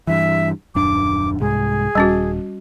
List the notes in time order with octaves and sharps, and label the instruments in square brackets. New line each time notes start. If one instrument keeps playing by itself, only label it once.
[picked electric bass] G2 E3 [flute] E5
[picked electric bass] D#1 F#2 D4 [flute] D6
[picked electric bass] C2 G#2 [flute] G#4
[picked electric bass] D#1 [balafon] G3 C#4 F#4